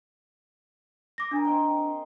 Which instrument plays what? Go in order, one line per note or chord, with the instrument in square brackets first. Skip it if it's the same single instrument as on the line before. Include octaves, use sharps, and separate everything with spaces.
[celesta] D6 A#6
[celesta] D4 [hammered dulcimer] G#4 A#4
[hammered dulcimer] C4 D#5 G5